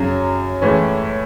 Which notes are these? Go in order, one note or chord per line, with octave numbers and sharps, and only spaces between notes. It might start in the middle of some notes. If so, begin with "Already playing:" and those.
Already playing: F#2 C#3 F#3
A2 E3 G#3 C#4